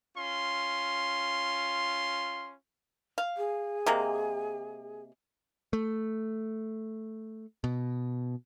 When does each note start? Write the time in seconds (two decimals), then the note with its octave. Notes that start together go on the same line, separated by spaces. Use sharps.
0.17 C#4 F4 C6
3.18 F5
3.37 G#4
3.86 C3 G#3 A#3
5.73 A3
7.64 B2